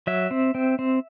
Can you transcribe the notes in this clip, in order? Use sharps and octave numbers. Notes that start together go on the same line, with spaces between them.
F#3 E5
C4
C4
C4